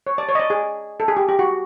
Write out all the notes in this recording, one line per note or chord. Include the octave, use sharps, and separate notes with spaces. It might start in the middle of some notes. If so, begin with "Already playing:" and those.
C#5
D5
C#5
D#5
D5
G#4
A4
G#4
G4
G4
F#4